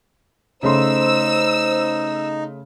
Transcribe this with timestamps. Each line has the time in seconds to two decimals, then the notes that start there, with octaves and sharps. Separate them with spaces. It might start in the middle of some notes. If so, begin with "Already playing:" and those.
0.63 C#3 A3 D#4 C5 C6 E6